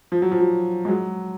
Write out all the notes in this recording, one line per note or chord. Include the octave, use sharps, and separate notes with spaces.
F3
F#3
F3
F#3
G#3
F#3